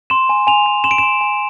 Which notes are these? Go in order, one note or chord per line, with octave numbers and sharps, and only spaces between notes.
C6 E7
G#5
G#5 F7
G#5
C6 E7
D7
C6 E7
G#5